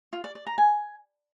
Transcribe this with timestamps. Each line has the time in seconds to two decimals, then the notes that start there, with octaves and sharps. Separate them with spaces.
0.13 F4
0.24 D5
0.35 D5
0.47 A#5
0.58 G#5